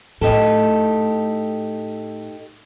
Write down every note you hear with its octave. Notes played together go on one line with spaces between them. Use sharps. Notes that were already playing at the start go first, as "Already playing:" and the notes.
A2 D#4 G4 A4